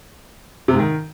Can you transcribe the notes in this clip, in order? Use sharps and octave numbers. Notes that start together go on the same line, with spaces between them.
C3
G#2
D#3